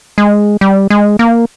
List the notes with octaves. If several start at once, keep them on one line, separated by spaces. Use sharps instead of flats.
G#3
G3
G#3
A#3